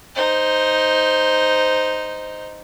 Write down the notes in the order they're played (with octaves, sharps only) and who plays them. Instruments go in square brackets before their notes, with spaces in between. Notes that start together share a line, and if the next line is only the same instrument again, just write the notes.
[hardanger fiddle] D#4 C5